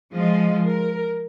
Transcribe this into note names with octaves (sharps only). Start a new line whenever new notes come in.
F3 G#3 F4 D#5
A#4